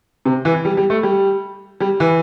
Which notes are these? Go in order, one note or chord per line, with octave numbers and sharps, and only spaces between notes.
C3
E3
G3
G3
A3
G3
G3
E3